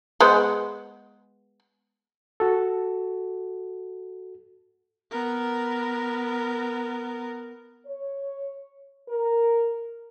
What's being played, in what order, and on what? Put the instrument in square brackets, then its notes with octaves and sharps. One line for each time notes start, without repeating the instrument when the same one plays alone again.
[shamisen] G#3 B3 C5
[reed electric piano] F#4 A4
[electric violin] B3 A#4
[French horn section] C#5
A#4